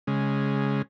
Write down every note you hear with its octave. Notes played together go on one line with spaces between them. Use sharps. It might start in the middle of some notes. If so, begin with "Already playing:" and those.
C#3 G#3